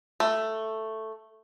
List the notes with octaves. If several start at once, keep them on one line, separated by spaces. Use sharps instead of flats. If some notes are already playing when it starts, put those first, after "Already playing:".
A3